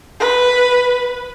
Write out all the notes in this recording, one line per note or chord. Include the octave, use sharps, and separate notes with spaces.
B4